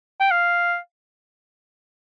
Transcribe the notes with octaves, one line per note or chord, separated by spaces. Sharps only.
G5
F5